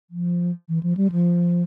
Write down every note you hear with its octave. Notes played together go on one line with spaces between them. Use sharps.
F3
E3
F3
G3
F3